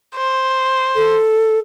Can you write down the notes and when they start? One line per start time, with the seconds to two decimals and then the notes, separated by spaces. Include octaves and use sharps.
0.16 C5
0.96 A4